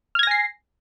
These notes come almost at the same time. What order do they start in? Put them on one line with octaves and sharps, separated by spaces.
F6 G#6 A#6 G#5 C7